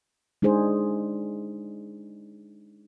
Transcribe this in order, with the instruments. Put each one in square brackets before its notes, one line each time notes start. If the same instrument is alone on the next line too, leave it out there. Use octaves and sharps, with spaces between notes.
[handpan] G#3 D4 D#4 G#4 C5